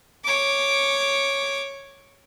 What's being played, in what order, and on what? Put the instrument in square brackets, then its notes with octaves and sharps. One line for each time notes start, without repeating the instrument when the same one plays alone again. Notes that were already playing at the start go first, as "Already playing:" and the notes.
[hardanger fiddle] C#5 D6